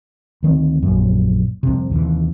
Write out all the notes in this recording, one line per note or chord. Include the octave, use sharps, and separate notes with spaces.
D2 D#3 C4
A#1 F#2
C2 F2 C3
D#2 C3 E3